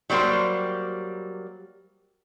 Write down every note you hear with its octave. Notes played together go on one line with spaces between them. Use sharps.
F#3 G3 A#3 G4 C5